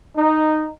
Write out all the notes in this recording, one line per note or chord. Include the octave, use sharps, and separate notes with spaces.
D#4